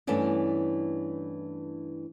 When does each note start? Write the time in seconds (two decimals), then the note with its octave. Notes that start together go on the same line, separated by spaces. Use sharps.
0.07 G2 E3 A3 B3 C#4 D4